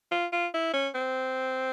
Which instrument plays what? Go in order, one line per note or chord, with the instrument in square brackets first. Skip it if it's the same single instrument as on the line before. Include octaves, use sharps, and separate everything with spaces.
[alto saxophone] F4
F4
E4
C#4
C4